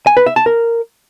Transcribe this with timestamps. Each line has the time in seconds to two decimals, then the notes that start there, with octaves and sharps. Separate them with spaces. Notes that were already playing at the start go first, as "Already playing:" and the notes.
0.07 G#5
0.17 B4
0.26 E5
0.36 A5
0.46 A#4